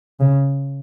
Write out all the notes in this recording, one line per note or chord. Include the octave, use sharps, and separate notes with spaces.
C#3